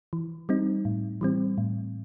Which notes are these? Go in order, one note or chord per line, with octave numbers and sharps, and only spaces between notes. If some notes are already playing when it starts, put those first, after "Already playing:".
E3
G3 C4 D#4
A2
E3 G3 C4
A2